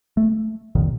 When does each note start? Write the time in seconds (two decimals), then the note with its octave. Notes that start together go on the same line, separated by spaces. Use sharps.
0.17 A3
0.75 C2 F2 A#2 D#3